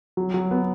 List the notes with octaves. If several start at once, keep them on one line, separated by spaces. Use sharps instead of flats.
F#3
F#3
B3